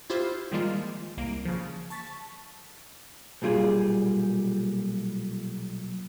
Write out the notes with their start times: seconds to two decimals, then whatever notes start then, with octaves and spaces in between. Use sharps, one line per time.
0.10 E4 F4 G4 C5
0.52 D#3 F3 G3 G#3 A#3 F4
1.17 C2 A#3 D7
1.46 C#3 F3
1.90 A5 C#6 A6 B6
3.42 B1 A#2 G3 F4 G#4